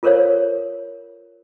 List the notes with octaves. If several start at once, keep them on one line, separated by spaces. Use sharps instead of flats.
F4 A4 A#4 C5 C#5 F5